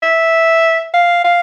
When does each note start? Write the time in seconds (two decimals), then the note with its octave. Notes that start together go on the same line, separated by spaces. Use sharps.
0.03 E5
0.94 F5
1.24 F5